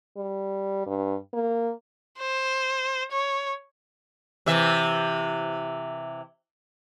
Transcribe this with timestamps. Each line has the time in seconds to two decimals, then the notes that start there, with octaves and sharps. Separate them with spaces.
0.17 G3
0.86 G2
1.34 A#3
2.19 C5
3.12 C#5
4.46 C3 E3 E5